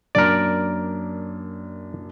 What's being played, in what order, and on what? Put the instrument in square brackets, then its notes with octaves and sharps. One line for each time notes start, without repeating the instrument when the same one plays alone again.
[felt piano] F#2 A#3 D4 [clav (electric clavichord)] A#4 D5